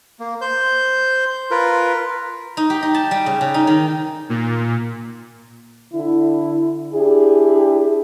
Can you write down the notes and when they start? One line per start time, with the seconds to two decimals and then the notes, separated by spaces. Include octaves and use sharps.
0.20 A#3
0.41 C5 G6
1.51 F4 A#4 B4
2.57 D#4
2.70 G4
2.83 D#4
2.94 A5
3.11 G3
3.26 C#3
3.41 C#3
3.54 D#4
3.67 D#3
4.29 A#2
5.94 D3 E4
6.94 D4 E4 G4 G#4